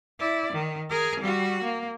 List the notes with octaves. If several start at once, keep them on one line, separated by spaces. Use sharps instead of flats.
E4 D5
D#3
G#4 A#4
G3 F#4
A#3